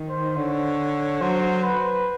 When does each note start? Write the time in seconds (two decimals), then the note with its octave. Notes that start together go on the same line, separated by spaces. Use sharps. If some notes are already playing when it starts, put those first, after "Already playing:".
Already playing: D#3
0.09 C5
0.37 D3 C#5
1.21 F#3 C5
1.64 B4